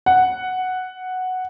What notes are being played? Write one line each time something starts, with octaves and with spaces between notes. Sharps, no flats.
F#5